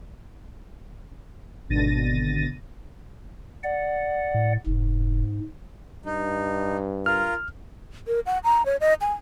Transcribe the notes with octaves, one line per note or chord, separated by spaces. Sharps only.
G#1 B2 D3 A6 A#6 D#7
D5 F#5
A2
F1 G#2
G2 D#4
F4 A#4 F6
A#4
F#5
A#5
C#5
D#5
G#5